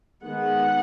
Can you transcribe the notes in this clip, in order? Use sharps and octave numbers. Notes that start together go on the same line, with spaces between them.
D#3 G#3 B3 F#5